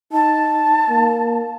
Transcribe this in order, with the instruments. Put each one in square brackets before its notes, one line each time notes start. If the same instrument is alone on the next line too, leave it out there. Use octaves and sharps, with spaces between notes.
[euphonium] D#4 [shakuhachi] A5
[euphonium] A#3